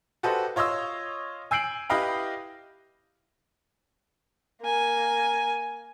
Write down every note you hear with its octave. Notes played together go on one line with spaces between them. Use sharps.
F#4 G4 A4 B4 C5 D#5
F4 C#5 D#5 C6 E6
G#5 E6 G6 C7 D7 F#7
E4 G4 B4 D#5 F5 B5
A#3 G#5